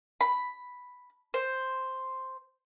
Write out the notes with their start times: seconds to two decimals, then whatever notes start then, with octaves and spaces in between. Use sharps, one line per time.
0.21 B5
1.34 C5